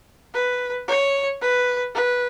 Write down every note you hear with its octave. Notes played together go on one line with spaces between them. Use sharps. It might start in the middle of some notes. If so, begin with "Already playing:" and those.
B4
C#5
B4
B4